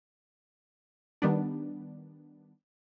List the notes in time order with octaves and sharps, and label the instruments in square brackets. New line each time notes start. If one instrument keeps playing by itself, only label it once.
[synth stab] D#3 G3 B3 D4